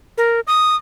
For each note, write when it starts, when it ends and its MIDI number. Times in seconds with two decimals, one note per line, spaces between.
0.18 0.40 70
0.47 0.76 87